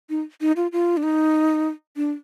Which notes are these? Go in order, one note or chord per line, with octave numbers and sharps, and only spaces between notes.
D#4
D#4
F4
F4
D4
D#4
D4